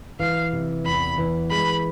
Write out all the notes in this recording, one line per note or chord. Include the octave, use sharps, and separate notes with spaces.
E3 F5
C3
E2 B5
E3
G#3 B5